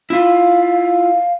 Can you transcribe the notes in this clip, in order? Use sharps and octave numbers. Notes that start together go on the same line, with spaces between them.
E4 F4 F5